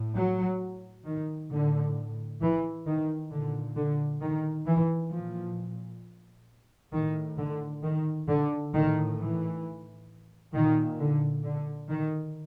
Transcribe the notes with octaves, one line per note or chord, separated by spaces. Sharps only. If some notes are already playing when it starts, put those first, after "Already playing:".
Already playing: A2
F#3
D#3
A2 D3
E3
D#3
A#2 D3
D3
D#3
E3
A#2 F3
A2 D#3
D3
D#3
D3
A2 D#3
E3
A#2 D#3
D3
D3
D#3